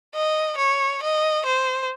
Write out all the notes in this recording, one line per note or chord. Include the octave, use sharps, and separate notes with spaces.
D#5
C#5
D#5
C5